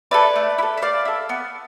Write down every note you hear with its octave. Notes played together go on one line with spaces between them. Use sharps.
E4 A4 B4 D5
A3
E4
A4
E5
A3 D5 F5
E4 A4
B3